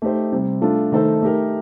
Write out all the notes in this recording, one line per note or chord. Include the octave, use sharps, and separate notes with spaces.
A3 D#4 G4 C5
C3 G3 C4
A3 D4 F4 A4
D#3 A3 D#4 A4 C5
A3 D#4 G4 A#4